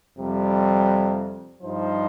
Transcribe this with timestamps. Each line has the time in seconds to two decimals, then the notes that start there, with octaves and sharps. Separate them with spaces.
0.18 F2 C3 G3
1.63 G2 F3 D#4 C5